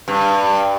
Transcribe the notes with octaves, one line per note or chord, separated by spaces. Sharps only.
G2